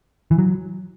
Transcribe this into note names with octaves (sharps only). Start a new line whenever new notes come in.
E3
F#3